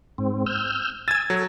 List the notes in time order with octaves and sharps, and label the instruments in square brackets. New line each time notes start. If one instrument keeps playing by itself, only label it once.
[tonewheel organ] G#2 C4
E6 F6 G6
[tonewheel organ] G#5 E6 [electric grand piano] G#6 A6
[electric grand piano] F#3 [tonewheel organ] A4